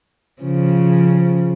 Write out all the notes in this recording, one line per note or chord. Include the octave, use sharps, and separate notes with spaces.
C#3 F3